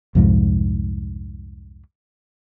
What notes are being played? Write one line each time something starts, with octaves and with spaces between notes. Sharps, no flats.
C2 F2 G#2